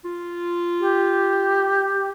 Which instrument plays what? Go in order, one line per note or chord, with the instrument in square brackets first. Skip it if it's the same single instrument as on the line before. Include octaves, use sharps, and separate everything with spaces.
[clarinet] F4
[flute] G4